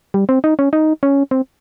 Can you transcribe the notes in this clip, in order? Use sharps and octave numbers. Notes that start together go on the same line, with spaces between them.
G3
C4
D#4
C#4
D#4
C#4
C4